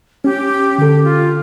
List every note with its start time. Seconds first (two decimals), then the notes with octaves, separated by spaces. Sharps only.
0.24 C#4 G4
0.78 D3 G4 A4
1.04 F4